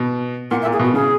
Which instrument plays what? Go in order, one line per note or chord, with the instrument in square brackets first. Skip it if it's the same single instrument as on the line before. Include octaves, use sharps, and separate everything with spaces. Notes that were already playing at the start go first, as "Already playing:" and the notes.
Already playing: [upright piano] B2
[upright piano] A#2 [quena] F#5
[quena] E5
[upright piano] A#2
[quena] G#4
[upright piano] B2 [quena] F#4
[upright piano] C#3 [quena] G#4